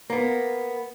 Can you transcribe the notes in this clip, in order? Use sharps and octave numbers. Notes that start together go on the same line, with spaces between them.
A#3 B3